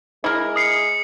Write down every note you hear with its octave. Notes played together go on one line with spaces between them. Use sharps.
G#3 E4 A#4
D#6 C7 C#7